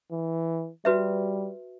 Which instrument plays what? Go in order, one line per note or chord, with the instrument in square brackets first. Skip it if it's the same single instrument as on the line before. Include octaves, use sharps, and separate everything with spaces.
[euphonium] E3
[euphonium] G3 [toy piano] F#4 B4 E5